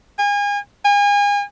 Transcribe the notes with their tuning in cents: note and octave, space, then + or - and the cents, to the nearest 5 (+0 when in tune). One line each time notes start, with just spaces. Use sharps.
G#5 -35
G#5 -35